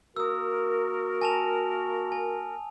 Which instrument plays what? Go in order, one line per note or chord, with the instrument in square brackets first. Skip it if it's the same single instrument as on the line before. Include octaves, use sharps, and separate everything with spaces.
[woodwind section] A#3 F#4 A#4 [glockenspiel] D#6 E6
[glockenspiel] G#5 A5 F7
G#5